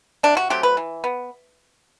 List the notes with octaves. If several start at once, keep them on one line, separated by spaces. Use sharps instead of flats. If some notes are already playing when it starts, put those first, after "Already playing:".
C3 D4
F#4
F#3 A3 C4 G4
B4
E3
B3